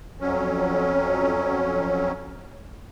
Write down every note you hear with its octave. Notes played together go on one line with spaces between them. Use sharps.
F2 F#3 C#4